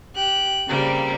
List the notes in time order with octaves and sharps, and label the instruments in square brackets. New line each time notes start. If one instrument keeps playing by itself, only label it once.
[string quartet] G4 F#6
C#3 G3 A#3 C4